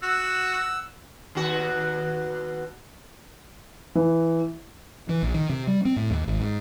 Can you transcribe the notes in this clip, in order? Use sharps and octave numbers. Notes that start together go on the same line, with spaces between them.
F#4 F#5 E6
D#2 B2 F#4
E3
E3
A#1
D#3
C3
G3
C4
A2
D#2
G#1
G#2